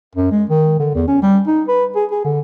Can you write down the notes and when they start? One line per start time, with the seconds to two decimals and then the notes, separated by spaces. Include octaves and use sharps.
0.15 F#2
0.32 G#3
0.50 D#3
0.80 D3
0.95 E2
1.08 C#4
1.22 G3
1.47 D#4
1.68 B4
1.96 G#4
2.11 G#4
2.24 D3